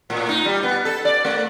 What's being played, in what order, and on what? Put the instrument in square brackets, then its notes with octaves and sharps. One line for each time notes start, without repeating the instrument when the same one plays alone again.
[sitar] A2
D#4
G3
B3
A4
D5
A3